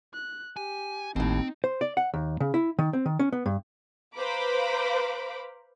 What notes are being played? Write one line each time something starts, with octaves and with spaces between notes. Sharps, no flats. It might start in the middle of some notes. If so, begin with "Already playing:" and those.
F#6
G4 G#5
G#1 D#2 A2 C4 D#4
C5
D5
F#5
D#2
C#3
E4
D#3
C4
D#3
C#4
B3
G2
B4 C5 F5 A#5 B5 D6